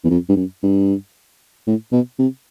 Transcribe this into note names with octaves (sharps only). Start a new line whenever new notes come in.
E2
F2
G2
F#2
G2
A2
B2
C3